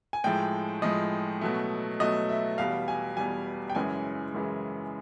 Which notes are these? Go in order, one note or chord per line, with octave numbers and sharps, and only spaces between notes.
G#5
A2 F3 G#3 G5
A2 F3 G#3 D#5
B2 F#3 A3
B2 F#3 A3 D#5
E5
E2 B2 G3 F5
G#5
E2 B2 G3 G#5
G5
F#2 C#3 E3 G#3 G#5
F#2 C#3 E3 G#3